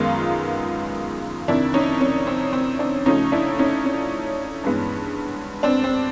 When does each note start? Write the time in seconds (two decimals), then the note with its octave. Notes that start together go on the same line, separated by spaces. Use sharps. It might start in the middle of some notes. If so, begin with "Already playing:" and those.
Already playing: F#2 D#3 G#3 B3 D#4 F4
1.48 F2 C3 D#3 D4 E4
1.74 C#4 D#4
2.01 C#4
2.27 C4
2.53 C4
2.79 C4 D4
3.06 C#3 F3 A3 C#4 D#4
3.32 D4 E4
3.59 C#4 D#4
3.85 C#4
4.64 G2 E3 G#3 B3
5.63 C4 D4
5.84 C4